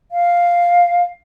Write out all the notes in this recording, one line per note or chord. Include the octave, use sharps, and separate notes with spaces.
F5